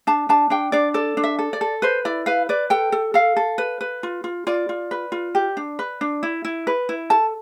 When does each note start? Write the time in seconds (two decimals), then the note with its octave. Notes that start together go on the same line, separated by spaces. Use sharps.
0.07 D4 A5
0.29 D4 A5
0.50 D4 G5
0.72 D4 D5
0.94 A4 D5
1.17 D4
1.24 E5
1.39 A4
1.53 D5
1.61 A4
1.82 B4 C5
2.05 E4 D5
2.26 B4 F5
2.49 B4 D5
2.70 A4 G5
2.92 A4
3.14 A4 F5
3.37 A4
3.58 B4
3.81 B4
4.03 F4
4.24 F4
4.47 F4 D5
4.69 F4
4.91 B4
5.12 F4
5.35 G4
5.57 D4
5.79 B4
6.01 D4
6.23 E4
6.45 E4
6.67 B4
6.89 E4
7.10 A4 A5